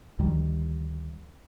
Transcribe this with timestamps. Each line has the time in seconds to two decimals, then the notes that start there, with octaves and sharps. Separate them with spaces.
0.19 D2 D#3 F3 G3